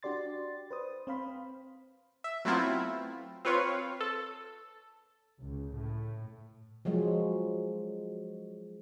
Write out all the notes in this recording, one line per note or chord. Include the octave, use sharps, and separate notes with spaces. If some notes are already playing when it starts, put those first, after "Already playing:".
D4 F#4 G4 D5 C6 A6
B4 C5 D#6
C4 C5 F5 B5
E5
F#3 A3 B3 C4 E4 F4
C4 F4 B4 C#5 F5
A4
C#2
A2
F3 F#3 G#3